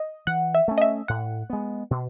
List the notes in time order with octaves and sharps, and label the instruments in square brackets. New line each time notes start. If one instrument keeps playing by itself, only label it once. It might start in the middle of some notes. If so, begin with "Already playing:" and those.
Already playing: [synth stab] D#5
[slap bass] E3 [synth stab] F#5
[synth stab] E5
[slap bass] A3 C#4
[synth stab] D#5
E5
[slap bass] A2 [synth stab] F#5
[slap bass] G#3 B3
B2